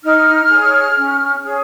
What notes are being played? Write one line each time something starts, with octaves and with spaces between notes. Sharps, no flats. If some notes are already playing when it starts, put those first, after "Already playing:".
D#4 F6
G#4 C#5
C#4
G#4 C#5